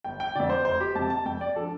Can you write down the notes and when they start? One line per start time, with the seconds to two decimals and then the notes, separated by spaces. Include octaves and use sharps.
0.04 G1 G5
0.20 G5
0.35 F2 D3 D5
0.50 C5
0.65 F1 C5
0.80 G4
0.95 F2 C3 A5
1.10 A5
1.26 F2 G5
1.41 D5
1.56 F3 D4 A4